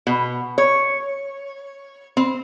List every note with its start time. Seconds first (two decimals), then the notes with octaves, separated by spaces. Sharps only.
0.07 B2
0.58 C#5
2.17 C4